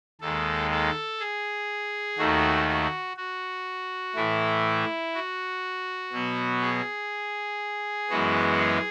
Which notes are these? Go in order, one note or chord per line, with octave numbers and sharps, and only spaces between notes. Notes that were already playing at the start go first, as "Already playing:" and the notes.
D#2 D#3 G#3 A4
A4
G#4
D#2 D#3 A3 F#4
F#4
F#4
A2 E3 A3 E4
F#4
B2 F#3 B3
G#4
F#2 E3 G#3 B3 F#4
G#4